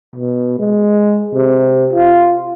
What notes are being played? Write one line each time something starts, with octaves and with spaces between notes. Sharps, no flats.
B2
G#3
C3
F4